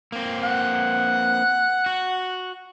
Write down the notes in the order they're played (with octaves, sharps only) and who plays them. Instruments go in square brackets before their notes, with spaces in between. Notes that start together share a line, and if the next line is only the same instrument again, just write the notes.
[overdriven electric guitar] A#3 C4
[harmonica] F#5
[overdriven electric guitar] F#4